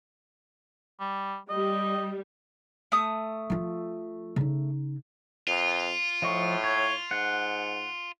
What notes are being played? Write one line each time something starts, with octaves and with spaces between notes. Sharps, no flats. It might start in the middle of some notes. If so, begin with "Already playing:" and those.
G3
G3 D#5
A3 D#6
F3 F4
C#3 D#4
F2 F4
A2 F3 D#5 C#6
C#5
G#2 F#5